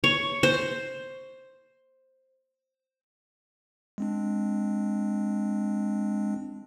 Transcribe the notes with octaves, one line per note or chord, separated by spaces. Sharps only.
C#5
C5
G#3 C4 D4